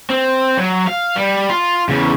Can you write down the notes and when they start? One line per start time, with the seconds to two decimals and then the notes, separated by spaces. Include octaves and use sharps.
0.10 C4
0.57 F#3
0.88 F5
1.17 G3
1.50 F4
1.89 E2 C#3